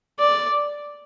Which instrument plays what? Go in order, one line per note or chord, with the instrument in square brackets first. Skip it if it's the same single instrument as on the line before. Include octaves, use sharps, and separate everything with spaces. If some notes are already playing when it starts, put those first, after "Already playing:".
[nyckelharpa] D5